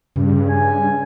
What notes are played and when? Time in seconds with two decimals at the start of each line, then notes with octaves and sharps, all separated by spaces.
0.16 G2 C#3
0.50 G#5